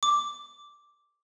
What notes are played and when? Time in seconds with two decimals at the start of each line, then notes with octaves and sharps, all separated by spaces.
0.03 D6